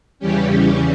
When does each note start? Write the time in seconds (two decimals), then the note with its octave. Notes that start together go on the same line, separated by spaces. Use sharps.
0.19 E2 C#3 E3 G3 C#4 G4
0.49 G4